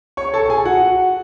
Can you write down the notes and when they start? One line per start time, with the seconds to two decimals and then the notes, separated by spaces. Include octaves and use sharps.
0.17 C#5 C#6
0.34 A4 A5
0.49 G#4 G#5
0.65 F#4 F#5